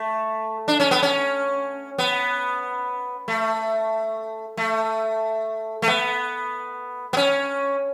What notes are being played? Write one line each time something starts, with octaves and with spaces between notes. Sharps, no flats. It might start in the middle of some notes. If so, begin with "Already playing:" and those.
Already playing: A3
D4
C#4
B3
C#4
B3
A3
A3
A3
B3
B3
C#4